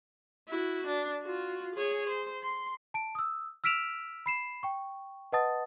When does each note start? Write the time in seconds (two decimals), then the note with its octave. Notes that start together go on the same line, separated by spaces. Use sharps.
0.49 E4 F#4
0.86 D4
1.22 F4 F#4
1.75 G#4 C#5
2.09 C5
2.44 C6
2.94 A5 D7
3.15 D#6 E6
3.64 E6 F6 B6 D7 E7 F7
4.26 B5 C7 E7
4.63 G5 C#6
5.32 B4 D#5 F#5 A5 D#6 A6